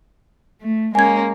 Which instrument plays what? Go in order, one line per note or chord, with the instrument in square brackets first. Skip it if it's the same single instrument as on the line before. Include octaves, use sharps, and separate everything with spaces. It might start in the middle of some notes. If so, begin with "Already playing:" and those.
[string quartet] A3
[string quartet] G#3 A#3 C#4 [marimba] G#5 G#6